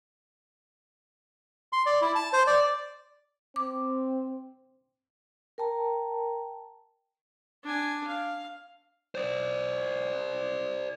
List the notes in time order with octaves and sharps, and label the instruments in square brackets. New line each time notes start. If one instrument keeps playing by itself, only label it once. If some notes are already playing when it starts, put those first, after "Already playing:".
[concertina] C6
D5
E4
A5
C5
D5
[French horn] C4 [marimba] D6
[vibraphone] A#4 G5 A5 A#5
[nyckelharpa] D4 G#5
F5
[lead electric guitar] C5 D5